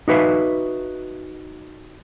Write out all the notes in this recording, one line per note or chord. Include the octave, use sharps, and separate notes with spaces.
D#4 F#4 B4 E5 F5